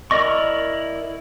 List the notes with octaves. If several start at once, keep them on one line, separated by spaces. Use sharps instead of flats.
E4 A#4 D5 D#5 C#6